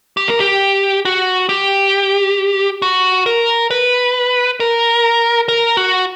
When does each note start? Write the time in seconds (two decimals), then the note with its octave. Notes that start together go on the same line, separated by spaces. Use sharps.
0.17 G4
0.28 A#4
0.40 G4
1.05 F#4
1.49 G4
2.82 F#4
3.26 A#4
3.71 B4
4.60 A#4
5.48 A#4
5.77 F#4